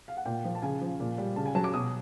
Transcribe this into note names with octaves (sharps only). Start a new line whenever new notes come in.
F5
F#5
A#2 G5
F3
A5
C#3 G#5
F3
A#2
G3
C#3 A5
G#5
F#3 A5
D6
B2 D#6